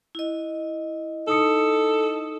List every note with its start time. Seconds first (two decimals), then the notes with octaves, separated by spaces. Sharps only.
0.15 E4 D#5
1.27 D#4 A4 D#6 C#7